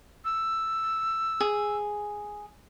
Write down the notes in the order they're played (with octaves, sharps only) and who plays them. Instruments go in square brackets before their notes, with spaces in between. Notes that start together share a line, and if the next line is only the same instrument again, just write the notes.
[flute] E6
[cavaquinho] G#4